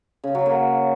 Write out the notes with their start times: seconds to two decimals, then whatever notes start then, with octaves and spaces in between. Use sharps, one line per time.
0.24 C#3
0.35 F#3
0.46 A#3